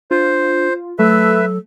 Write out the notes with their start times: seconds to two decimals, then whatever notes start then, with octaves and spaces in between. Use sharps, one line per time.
0.11 D4 F4 C5
0.99 F#3 A3 A4 B4 E5